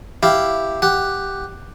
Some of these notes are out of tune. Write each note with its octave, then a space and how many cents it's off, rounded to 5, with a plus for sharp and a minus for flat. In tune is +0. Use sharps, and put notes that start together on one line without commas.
E4 +0 G4 +0 F5 +0
G4 +0 F#5 +0